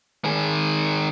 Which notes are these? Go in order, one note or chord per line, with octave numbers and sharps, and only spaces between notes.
D#3 G#4